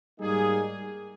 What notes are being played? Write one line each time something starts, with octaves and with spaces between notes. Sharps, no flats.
G#2 G3 A#3 D#4 G#4